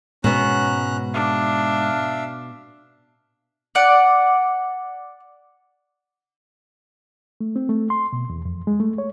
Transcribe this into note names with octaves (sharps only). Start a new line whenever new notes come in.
G#2 B2 G#3 B3 C#4 A#5 F#6
D4 E5 F5
D5 F#5
A3
C4
A3
C6
B2
E2
F2
G#3
A3
C#5